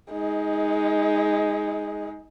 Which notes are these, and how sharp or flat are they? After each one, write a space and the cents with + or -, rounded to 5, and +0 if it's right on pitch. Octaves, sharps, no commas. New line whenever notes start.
G#3 +0 D#4 +25